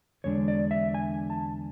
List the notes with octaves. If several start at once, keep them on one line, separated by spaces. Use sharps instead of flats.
E2 D3 G#3 D4 C#5
D5
E5
G#5
A5